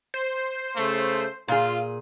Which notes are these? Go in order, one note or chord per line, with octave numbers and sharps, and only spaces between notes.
C5
C#3 A3
A#2 F4 G#4